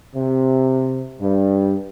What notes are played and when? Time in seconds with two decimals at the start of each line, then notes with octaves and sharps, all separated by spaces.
0.15 C3
1.20 G2